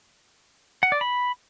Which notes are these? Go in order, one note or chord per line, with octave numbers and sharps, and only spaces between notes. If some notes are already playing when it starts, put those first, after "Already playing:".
F#5
D5
B5